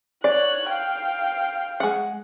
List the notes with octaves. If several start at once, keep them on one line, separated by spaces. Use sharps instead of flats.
C#5 D5 F#6
F5 G5
G#3 F#5